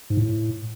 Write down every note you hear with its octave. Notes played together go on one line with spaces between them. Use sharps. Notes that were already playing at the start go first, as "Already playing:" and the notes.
G#2
A2